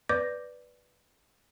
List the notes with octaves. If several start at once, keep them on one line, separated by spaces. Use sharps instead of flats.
B4 D5 D6 G6 A#6